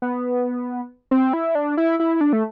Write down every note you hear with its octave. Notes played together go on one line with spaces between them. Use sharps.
B3
C4
E4
D4
E4
E4
D4
A3